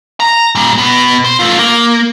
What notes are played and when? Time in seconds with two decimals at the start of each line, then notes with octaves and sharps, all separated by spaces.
0.20 A#5
0.55 A#2 G3
0.78 B2
1.25 C5
1.40 A3 F4
1.59 A#3